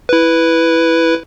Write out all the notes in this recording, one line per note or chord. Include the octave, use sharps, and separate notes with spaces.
E4 B4